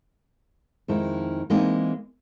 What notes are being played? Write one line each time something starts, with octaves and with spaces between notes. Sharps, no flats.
F2 D#3 G#3 E4
E3 G#3 A#3 C4 D#4 G#4